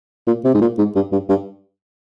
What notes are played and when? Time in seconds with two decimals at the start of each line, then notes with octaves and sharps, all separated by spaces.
0.27 A#2
0.44 C3
0.54 G#2
0.61 A#2
0.78 G#2
0.95 G2
1.12 G2
1.29 G2